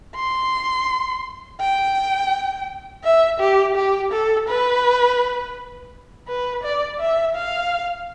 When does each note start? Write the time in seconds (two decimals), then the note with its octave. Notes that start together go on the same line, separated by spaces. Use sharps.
0.16 C6
1.60 G5
3.04 E5
3.40 G4
3.76 G4
4.12 A4
4.48 B4
6.28 B4
6.63 D5
7.00 E5
7.35 F5